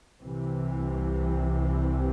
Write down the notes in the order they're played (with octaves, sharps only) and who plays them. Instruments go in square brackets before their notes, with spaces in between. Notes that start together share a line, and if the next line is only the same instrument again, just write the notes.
[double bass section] C2 C3 E3